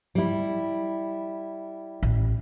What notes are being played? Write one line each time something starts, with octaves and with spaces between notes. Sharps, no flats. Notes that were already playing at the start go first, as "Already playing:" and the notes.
G3 E4
A1